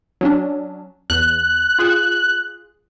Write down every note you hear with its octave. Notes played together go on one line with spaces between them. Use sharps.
F#3 C#4 D4
E2 F#6
F4 G#4